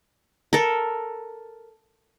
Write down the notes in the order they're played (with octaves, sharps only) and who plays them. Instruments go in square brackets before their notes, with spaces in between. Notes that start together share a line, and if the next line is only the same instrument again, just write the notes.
[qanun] A4 A#4